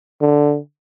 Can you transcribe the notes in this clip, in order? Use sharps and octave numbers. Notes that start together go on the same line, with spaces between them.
D3